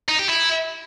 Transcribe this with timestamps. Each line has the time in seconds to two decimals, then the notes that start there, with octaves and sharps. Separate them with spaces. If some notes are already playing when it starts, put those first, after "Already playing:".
0.09 D#4
0.19 G4
0.29 E4